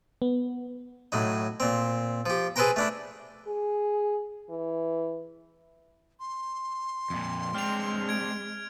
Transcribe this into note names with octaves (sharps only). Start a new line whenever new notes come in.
B3
A2 F#3 D#4
A#2 C4
F3 G4
G#4 A4 B4 C5 G5 A#5
A3 D4 E4
G#4
E3
C6
F2 A#2
G#3 C4 D4 F6 F7
G#6 D7